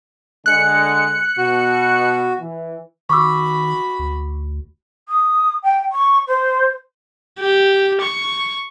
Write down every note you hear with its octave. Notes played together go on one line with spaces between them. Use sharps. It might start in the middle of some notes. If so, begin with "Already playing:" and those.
D3 G#3 F#6 C#7
B2 F#4
E3
D#3 F#4 B5 C#6 D6 E6
D2
D#6
G5
C#6
C5
G4
C#6